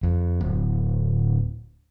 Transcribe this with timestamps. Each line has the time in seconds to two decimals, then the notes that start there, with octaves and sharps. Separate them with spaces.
0.03 F2
0.41 D1